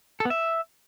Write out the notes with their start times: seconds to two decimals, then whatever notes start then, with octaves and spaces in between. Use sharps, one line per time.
0.20 A4
0.25 B3
0.30 E5